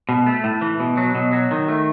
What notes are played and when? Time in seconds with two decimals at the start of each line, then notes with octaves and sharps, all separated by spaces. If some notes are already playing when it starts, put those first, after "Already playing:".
0.09 B2
0.26 A3
0.44 A2
0.61 E3
0.80 B2
0.97 F#3
1.15 B2
1.33 F#3
1.51 D#3
1.68 A3